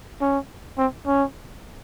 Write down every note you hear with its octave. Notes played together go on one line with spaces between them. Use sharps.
C#4
C4
C#4